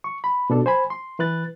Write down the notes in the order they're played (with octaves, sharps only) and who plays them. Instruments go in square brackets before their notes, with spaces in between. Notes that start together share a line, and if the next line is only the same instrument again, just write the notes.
[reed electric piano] C#6
B5
B2 D4 A4
C5 G#5 B5
C6
E3 B4 F#6 A6